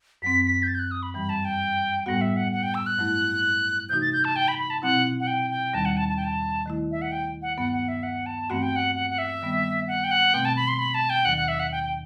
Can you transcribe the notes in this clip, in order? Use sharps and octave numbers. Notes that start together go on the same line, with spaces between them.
F#2 F#3 C4 B6
B6
G6
A6
G6
F#6
D#6
B5
G2 E3 G3 B5
A5
G5
A2 G3 B3 F#4 F#5
E5
F#5
F#5
G5
E6
F#6
G2 F#3 A3 E4
C3 E3 A3 D#4 F#4 G6
A6
G6
A5
G5
B5
B5
A5
B2 F#3 C4 E4 F#5
F#5
G5
G5
D#2 D#3 G3 A5
F#5
A5
A5
G5
A5
D#3 A3 E4
E5
F#5
G5
F#5
G2 F#3 B3 F#5
F#5
E5
F#5
A5
G2 E3 A3 C4 F#4 F#5
G5
F#5
F#5
F#5
E5
D#3 G3 B3
F#5
G5
F#5
B2 A3 C4 G5
A5
B5
C6
B5
A5
G5
D#2 D#3 F#3 F#5
F#5
E5
F#5
G5
G5